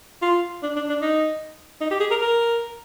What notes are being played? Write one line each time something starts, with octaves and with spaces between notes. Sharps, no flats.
F4
D4
D4
D4
D#4
D#4
G4
G#4
A#4
A#4